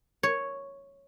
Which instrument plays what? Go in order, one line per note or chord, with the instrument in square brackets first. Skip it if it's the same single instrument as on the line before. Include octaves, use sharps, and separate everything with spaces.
[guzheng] C#5